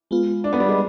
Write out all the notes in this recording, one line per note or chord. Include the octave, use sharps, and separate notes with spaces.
G#3 B3 F4
D4
B3
G3
G#3